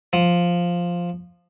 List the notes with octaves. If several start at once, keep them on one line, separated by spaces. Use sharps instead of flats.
F3